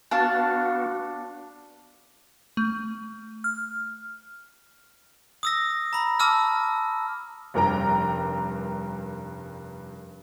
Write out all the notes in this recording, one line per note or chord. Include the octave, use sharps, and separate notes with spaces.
B3 D4 F#4 F5 A5
A3
F6
D#6 E6 A#6
A#5 B5
A5 D6 E6 F6
F1 G2 A#4 G5 A#5